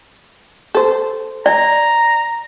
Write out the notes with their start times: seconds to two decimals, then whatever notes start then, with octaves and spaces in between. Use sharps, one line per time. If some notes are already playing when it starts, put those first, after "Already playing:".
0.75 A4 C5
1.46 D5 A#5